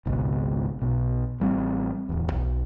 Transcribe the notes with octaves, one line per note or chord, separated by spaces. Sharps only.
G#1 C#2 G#2 B2
B1 B2
A1 G3 A#3 C4
D1 E2
B1